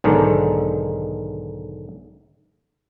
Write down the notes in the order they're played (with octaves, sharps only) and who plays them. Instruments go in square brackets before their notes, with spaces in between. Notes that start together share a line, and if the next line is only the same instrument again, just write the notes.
[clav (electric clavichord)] B1 G#2 D3 D#3